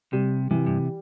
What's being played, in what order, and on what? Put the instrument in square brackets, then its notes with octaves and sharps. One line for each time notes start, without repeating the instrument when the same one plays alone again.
[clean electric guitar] C3 [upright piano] G3
[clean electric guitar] C3 [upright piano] E3
[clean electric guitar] G2